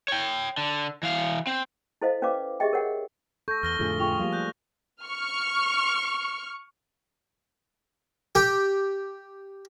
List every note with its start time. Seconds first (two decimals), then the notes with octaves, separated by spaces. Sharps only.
0.08 C#5 G5
0.57 D3
1.03 E3 F5
1.47 C4
2.02 E4 A4 C5 D#5 F5
2.22 C#4 B4 D5 F5 D6
2.60 G4 G#4 D#5 E5 G5
2.73 A#4 C#5 F#5 G5
3.48 A4 C#6 G6 A#6
3.63 E2 F6 A#6 G7
3.79 F2 A2 D3 A3 F4 G#4
4.00 F4 G#4 G5 C#6 F7
4.19 F3 G3 A#3 G4 F5
4.33 F#6 G6
5.04 C#6 F6
8.35 G4